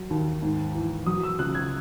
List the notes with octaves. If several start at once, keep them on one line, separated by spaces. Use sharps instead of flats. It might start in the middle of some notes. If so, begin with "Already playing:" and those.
Already playing: F#3
D#2
G#2
E3
F#3 D#6
E6
C#2 F#6
G#6